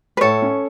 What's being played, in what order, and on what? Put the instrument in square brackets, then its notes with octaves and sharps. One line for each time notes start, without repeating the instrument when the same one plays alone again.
[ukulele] B4
[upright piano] A2 [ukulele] A4 C#5
[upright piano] C#4